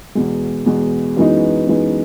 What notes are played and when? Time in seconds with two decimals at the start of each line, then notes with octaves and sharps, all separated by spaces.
0.15 E2 B2 G#3
0.66 E2 B2 G#3
1.17 F#2 E3 G#3 B3 D#4
1.67 F#2 E3 G#3 B3 D#4